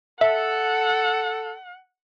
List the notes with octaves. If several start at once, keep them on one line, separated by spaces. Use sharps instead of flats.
A4 E5 F#5